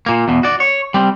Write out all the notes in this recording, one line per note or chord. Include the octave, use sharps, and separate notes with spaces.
A#2 A#3
E2 B2
F#4 D5
C#5
G3 C4